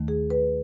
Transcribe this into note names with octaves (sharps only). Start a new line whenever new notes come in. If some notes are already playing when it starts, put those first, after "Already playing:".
Already playing: D#2 D#3 A3
G#4
B4